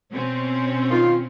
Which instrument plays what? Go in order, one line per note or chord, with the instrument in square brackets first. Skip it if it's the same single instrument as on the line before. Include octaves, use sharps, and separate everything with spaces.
[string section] B2 C4 C#4
[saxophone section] D#3 F4